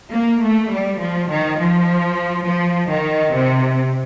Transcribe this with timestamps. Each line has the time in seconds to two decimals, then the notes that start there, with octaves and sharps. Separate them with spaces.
0.13 A#3
0.43 A3
0.72 G3
1.01 F3
1.30 D#3
1.59 F3
2.46 F3
2.90 D#3
3.33 C3